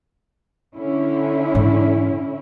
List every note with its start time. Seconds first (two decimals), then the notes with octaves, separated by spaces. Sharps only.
0.76 D3 C#4 E4
1.54 G#2 E3